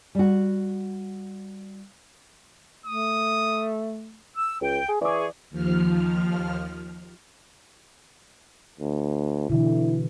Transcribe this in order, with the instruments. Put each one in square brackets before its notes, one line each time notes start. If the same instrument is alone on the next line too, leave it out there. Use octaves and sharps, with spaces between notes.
[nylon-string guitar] G3 F#4
[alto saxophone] A3 [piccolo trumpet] D#6
[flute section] E6
[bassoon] C#2 [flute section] G5
[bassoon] G#4
[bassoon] E3 [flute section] G#4 C#6 [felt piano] D5 D6
[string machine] D#2 F3 F6
[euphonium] D2
[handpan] B2 D3 E3 [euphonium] E4